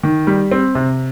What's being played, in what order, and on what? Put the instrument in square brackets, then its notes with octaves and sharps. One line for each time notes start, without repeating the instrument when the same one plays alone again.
[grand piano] D#3
G3
C4
C3